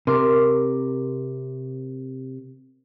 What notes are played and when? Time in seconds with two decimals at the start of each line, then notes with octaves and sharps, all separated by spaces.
0.07 C3 A#4 C6 D6